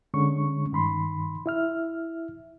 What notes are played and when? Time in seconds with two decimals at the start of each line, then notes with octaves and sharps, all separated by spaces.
0.14 D3 G#3 C#4 C#6
0.72 G2 D#3 B5 C6
1.46 E4 E5 F6